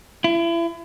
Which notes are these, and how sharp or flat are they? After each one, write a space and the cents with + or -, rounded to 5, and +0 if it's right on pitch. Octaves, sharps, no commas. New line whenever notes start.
E4 +35